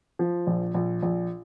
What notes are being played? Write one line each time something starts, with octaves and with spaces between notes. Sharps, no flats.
F3
A#1
A#1
A#1